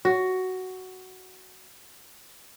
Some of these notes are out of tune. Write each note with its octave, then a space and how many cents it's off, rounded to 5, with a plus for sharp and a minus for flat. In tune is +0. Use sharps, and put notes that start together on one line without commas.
F#4 +10